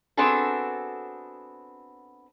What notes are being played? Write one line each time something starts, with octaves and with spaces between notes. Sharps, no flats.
B3 C4 D4 F#4 G#4 A4